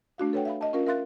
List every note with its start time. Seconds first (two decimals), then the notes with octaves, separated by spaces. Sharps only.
0.18 A3 D4 F#4 F5
0.33 A4 B4 C#5 F#5 G5
0.45 E5 F5 B5
0.61 D#5 A5
0.73 C#4 F4 A#4 F5
0.87 A#4 E5 F5 C6 F#6 A6